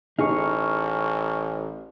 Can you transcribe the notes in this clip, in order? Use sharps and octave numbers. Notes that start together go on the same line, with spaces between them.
A1 D#4 G#4 C#6 F6